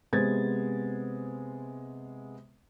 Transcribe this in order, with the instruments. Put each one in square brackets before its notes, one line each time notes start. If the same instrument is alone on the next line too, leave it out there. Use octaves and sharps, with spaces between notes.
[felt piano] C3 G#3 B3 C5 G#6 A6